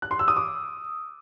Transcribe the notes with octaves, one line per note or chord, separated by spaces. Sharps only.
F#6
C6
E6
D#6
D6